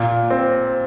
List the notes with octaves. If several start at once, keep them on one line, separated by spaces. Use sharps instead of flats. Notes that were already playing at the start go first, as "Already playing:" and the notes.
Already playing: A#2
C4